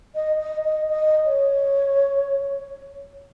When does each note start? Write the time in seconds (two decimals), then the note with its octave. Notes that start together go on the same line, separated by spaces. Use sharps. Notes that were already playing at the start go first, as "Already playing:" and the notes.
0.15 D#5
0.40 D#5
0.65 D#5
0.89 D#5
1.26 C#5